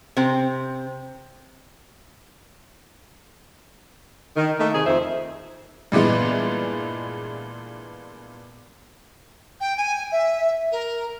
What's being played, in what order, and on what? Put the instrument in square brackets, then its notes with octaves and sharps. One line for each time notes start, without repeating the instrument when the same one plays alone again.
[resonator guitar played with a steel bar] C3 C4
[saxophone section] D#3
A3 A#3 D#4
C3 D#3 G#4
F2 D#3 F3 C5 E5
[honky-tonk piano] G2 A#2 E3 G#3 B3
[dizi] G5
G#5
E5
A#4